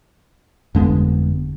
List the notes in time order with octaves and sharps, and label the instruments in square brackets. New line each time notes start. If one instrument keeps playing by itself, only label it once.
[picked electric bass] G1 D3 [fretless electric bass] F2 G#3 B3